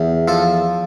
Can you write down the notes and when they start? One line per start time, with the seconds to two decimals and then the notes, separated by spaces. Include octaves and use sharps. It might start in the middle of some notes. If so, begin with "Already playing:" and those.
Already playing: E2
0.28 F3 A4